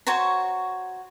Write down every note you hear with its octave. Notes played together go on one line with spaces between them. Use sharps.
F#4 C5 C#5 A#5